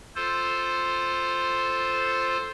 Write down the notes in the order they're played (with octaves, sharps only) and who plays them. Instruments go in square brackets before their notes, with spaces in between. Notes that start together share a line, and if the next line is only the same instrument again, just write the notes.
[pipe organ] F4 A4 C5